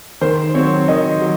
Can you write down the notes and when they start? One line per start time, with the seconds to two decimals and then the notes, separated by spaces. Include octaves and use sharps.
0.21 D#3 C5
0.54 F#3 C4 C#5
0.88 D#3 D#5
1.21 F#3